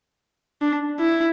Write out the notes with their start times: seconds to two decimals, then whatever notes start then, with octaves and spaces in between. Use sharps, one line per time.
0.62 D4
1.00 E4